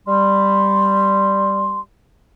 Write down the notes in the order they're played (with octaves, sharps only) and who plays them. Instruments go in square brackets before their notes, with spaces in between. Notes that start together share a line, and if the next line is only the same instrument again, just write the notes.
[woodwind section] G3 [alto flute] C6